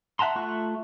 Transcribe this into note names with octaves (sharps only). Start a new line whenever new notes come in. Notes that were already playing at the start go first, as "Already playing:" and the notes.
E5 F#5 A5 A#5 C6
A3 F4 E5 C#6 F#6